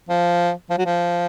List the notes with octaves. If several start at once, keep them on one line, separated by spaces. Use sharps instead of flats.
F3
F3
F#3
F3